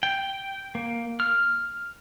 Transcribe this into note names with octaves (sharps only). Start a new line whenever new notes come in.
G5
A#3
F6